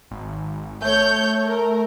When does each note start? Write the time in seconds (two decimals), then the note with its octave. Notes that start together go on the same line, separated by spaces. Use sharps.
0.11 G#1
0.82 A3 C#5 G6
1.45 A#4